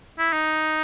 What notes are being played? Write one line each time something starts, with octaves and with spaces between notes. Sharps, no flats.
E4
D#4